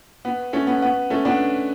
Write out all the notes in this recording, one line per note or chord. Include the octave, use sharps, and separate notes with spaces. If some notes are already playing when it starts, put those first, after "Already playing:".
B3
A3 C#4
B3
B3
A3 C#4
B3 D4